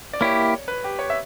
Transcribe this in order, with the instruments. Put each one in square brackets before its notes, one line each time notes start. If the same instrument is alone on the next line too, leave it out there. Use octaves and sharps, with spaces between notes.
[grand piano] D5
[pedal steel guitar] A#3 E4 G4 [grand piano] C#5
[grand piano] B4
G4
C#5
E5